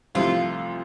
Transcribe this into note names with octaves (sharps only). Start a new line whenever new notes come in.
C2 C3 F3 A3 C4 F4